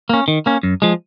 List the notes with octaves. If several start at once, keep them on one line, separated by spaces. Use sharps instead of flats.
A#3 C#4
D#3
A#3 C#4
F#2
F3 G#3